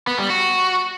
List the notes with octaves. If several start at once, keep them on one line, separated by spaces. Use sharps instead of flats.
B3
G3
F#4